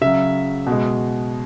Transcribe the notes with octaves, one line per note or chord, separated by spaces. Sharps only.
C#3 F#3 E5
B2 G#3